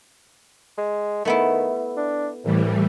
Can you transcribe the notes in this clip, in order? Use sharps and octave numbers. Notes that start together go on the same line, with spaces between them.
G#3
D#3 A3 B3 E4
D4
C2 A2 E3 G3